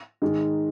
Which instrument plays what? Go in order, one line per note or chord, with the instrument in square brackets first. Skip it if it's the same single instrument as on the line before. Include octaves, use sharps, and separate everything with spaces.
[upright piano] G#2 D#3 G#3